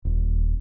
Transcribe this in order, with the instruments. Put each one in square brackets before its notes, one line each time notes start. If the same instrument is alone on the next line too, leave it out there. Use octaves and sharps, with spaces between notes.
[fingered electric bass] D#1